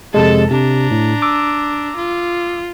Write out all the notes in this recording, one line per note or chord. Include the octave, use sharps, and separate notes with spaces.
F2 C3 G#3 A4 A5
C3 D4 A#5
A2
D6 E6
F4